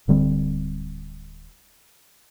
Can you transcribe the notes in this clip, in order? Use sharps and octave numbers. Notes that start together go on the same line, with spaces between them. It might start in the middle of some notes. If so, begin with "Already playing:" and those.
D1 D3 G3 C4